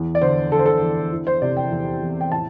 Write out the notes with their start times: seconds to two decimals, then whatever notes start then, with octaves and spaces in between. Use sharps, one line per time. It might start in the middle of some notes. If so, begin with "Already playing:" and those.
Already playing: E2
0.15 D5
0.22 D3 C5
0.52 D3 A4
0.59 C5
0.66 A4
0.82 E2
1.12 E3
1.27 C5
1.42 C3 D5
1.57 G5
1.71 E2
2.01 E2
2.21 G5
2.32 A2 A5